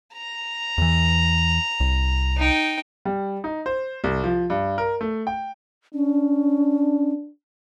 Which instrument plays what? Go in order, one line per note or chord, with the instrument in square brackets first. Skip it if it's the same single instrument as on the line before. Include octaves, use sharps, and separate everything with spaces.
[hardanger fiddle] A#5
[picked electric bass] E2 E3
C2
[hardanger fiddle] D#4 G5
[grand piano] G3
D#4
C5
C2
F3
G2
A#4
A3
G5
[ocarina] C#4 [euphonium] D4